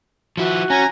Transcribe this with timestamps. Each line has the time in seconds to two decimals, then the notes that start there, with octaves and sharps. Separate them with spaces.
0.37 F3 E4 F#4
0.70 C#4 G#5 A#5